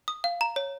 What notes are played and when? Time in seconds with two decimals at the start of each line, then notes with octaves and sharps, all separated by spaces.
0.08 D#6
0.24 F5
0.41 A#5
0.56 C#5